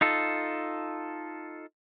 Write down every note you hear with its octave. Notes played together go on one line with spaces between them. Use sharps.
D#4 F4 A4